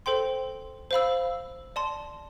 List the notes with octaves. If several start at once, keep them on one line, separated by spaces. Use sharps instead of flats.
A4 C5 G5 C6
C5 F5 B5 E6
D5 A5 C6